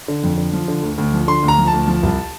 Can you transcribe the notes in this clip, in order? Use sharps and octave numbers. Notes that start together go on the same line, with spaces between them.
D3
F2
D3
F3
D3
D2
D2
F3
D3 C6
D2
A#5
F3
A5
D2
F3
C2